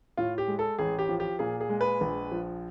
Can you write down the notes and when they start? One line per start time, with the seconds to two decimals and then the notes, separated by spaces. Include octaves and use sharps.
0.17 A2 F4
0.38 G4
0.48 G#3
0.59 A4
0.79 A1 G#4
0.99 G4
1.09 F3
1.20 G4
1.39 A#2 G#4
1.61 G#4
1.70 G#3
1.81 B4
2.01 A#1
2.32 F3